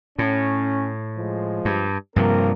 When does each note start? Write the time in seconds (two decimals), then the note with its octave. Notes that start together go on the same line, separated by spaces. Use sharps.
0.19 A2 C#4
1.16 F3 G#3
1.65 G2
2.16 G2 C3 F3 A#3 C4 A#4